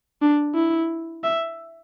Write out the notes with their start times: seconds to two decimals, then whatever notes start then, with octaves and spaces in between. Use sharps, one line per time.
0.22 D4
0.55 E4
1.23 E5